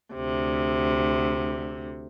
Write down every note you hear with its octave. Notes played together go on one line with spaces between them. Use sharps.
D2 C3